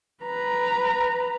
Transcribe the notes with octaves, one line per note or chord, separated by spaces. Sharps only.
B4 A#5